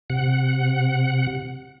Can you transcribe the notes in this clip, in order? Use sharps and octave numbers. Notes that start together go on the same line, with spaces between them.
C3 F#5